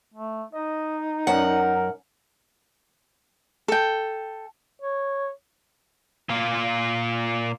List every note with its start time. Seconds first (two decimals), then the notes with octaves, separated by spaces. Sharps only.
0.14 A3
0.53 D#4 D#5
1.27 F#2 A#4 F#5
3.68 A4 G5
4.82 C#5
6.29 A#2 F4